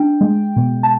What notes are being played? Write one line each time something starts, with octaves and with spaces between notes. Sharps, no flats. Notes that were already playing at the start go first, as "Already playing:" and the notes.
Already playing: D4 G5
G#3
B2
A5